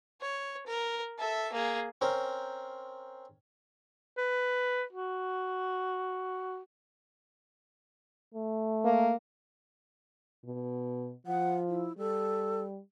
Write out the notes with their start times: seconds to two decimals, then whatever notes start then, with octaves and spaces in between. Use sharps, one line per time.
0.21 C#5
0.66 A#4
1.18 A4 E5
1.53 A#3 G#4
2.01 C4 C#4 A#4 C5
4.17 B4
4.93 F#4
8.34 A3
8.85 A#3
10.45 B2
11.27 F3 F#5
11.68 E4
11.98 G3 A4